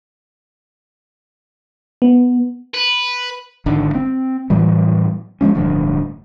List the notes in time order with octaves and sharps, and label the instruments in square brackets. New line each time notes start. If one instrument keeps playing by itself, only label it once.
[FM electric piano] B3
[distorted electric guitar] B4
[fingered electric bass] G#1 D3 D#3
C4
A2 E3 F#3 G3
F3 F#3 G#3 C#4
D1 D2 G2 F3